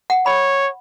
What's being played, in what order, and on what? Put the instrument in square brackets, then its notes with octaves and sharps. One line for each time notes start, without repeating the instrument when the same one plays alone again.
[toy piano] F#5
[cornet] C#5 [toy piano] B5